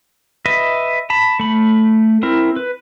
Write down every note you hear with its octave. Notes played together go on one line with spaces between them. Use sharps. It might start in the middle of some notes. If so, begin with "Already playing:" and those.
B4 D#5 E5
A5 B5
A3 B5
C4 E4 A#4
B4